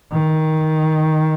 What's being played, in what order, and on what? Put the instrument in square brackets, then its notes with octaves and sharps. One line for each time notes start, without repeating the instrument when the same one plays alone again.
[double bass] D#3